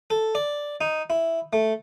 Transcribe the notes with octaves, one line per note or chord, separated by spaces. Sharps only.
A4
D5
D#4
E4
A3